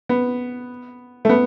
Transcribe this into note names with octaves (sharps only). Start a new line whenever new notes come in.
B3
A3
B3